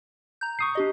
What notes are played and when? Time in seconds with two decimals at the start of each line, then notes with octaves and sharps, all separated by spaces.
0.41 A#5 G6
0.59 C#6 D#6 C7
0.75 D4 G4 D#5